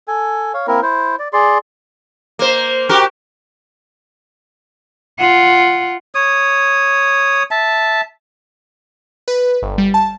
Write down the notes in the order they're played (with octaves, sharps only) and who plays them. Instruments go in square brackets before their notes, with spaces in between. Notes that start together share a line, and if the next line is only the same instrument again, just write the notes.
[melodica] A4 G#5
C#5 F5
A#3 C4 E4 A#4
E4 C5
D5
G#4 D5 C6
[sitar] A#3 C5
F#4 G4 A#4
[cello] F4 F#5
[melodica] C#5 D#6
E5 A5
[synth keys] B4
G1
G3
A5